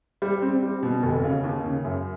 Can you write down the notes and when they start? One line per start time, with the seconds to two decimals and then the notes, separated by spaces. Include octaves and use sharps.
0.22 G3
0.42 C4
0.63 G3
0.83 B2
1.03 F1
1.24 C#3
1.44 D#2
1.64 C#3
1.85 F#2